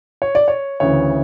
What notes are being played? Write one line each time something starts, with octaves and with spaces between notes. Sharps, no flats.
C#5
D5
C#5
D2 C#3 E3 C#5